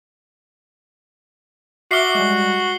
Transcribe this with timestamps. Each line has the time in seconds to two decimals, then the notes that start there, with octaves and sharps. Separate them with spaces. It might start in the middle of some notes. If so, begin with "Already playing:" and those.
1.91 F#4 E5 D6 F6 C7 G7
2.15 G3 G#3